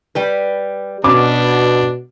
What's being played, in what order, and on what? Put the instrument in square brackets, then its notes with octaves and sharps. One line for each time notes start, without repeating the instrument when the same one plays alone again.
[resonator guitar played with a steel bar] G3 G4 B4
[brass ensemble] B2 [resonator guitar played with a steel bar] C#4 [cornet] D4 [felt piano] D6